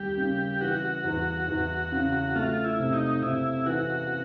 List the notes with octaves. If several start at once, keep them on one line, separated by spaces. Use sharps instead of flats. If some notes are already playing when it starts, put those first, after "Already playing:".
Already playing: D#2 G3 G4
C#3
E3 F#4
E2
E2
C#3
A3 F4
E4
C3
D#4
C3 E4
E3 F#4